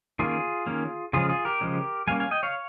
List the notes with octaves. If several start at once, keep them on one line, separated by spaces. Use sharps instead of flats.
D#3 A#3 C#4 F4 G#4
D#3 A#3 C#4
C#3 F3 G#3 C#4 F4 G#4
F4 G#4
G4 A#4
C#3 F3 G#3 C#4
G3 A#3 C#4 F5 G#5
F5 G#5
D#5 G5
C#5 F5